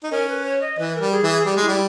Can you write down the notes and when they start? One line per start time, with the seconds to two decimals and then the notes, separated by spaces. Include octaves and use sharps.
0.04 D#4
0.11 C#4 A#4
0.29 B4
0.46 C#5
0.61 D#5
0.79 E3 B4
0.96 A#4
1.01 G3
1.12 G#4
1.23 E3
1.29 G#4
1.46 G3 G4
1.56 G#3
1.63 E4
1.68 G3